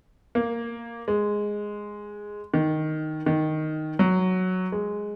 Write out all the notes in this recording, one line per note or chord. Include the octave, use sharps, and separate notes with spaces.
A#3
G#3
D#3
D#3
F#3
G#3